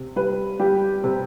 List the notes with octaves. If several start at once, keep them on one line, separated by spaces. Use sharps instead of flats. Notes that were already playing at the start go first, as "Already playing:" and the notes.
Already playing: C3
G3 B4
G3 G4
C3